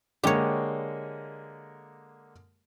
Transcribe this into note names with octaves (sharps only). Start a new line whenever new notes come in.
D3 G#3 A#3 G4 C#5